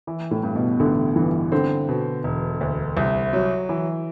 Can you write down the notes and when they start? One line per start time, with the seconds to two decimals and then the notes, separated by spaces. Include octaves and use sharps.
0.07 E3
0.31 A2
0.43 G2
0.55 B2
0.80 A1 D3
1.16 G2 E3
1.52 D3 C4
1.89 B2
2.24 E1
2.61 D2
2.97 C2
3.33 F#3
3.69 E3